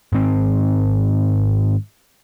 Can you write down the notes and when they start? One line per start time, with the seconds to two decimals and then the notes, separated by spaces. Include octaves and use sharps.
0.13 G#2 D#3 C4